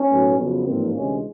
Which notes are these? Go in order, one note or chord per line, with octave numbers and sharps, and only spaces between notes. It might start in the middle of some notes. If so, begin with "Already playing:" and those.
Already playing: C#4
B1 A2 F#3
F2 C#3 F#3 B3
A1 G#2 F3 A#3 C4
D2 C3 E3 G#3 C#4